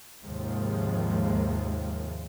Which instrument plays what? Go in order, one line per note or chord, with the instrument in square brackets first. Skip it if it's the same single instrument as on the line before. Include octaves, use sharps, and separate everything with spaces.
[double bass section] D#2 G#2 C3 F3 G#3